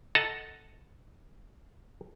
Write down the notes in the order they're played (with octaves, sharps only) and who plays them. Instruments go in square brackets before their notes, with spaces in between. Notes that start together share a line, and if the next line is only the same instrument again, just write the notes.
[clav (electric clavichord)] A4 D#5 F#5 A5 A#5